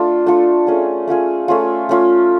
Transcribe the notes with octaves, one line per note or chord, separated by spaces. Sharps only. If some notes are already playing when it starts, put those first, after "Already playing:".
Already playing: A3 D4 F4 A4
A3 D4 F4 A4
A3 C#4 F4 G#4
A3 C#4 F4 G#4
A3 C#4 F4
A3 C#4 F4